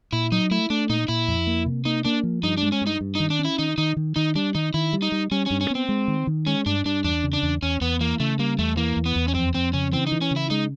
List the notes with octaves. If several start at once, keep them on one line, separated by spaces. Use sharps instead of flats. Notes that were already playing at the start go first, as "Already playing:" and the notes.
A#2 E4
F#3 D#4
A3 E4
A3 D4
A#2 D#4
A#2 E4
F2
A#3
C3
A#3 D#4
A#3 D4
F3
G2 D#4
D4
G#3
C#4
G2 D#4
G2
D#3 D#4
D4
C#4
E4
D#3 D#4
D#3 D#4
D#3
D#3 D#4
G3 D4
D#3 D#4
D#3 E4
G3
D#4
G3
G3 C#4
G2 C#4
C#4
B3 C4
G#3
D#3
D#3
G#3 C#4
G2 D4
G2 D4
E2 D4
C#3
D4
E2
E2 C#4
E2 B3
E3 A#3
C#3 A3
G3 A#3
E2 A3
E3 A#3
E2
B3
E2
C#4
F2 C4
F2 C4
C#3 C#4
E3 C4
D#4
E3
C#4
C#3
E4
G#3 D#4